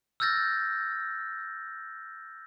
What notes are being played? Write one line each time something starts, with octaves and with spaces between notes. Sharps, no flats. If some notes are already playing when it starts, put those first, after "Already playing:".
E6 F6 G6 A6 A#6